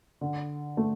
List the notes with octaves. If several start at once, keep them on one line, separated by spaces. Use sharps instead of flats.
D3
A3